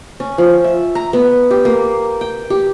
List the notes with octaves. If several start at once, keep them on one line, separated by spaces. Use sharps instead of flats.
C#4
F3
E5
A#5
B3
G4
A#3
G5
G4